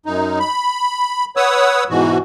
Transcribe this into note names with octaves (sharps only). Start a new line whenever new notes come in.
F#2 D#4
B5
B4 C#5 F#5 D#6 E6
G#2 B2 E3 F#4